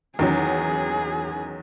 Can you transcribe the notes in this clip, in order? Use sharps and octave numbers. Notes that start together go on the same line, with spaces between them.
E2 D#3 F#3 C#4 G#4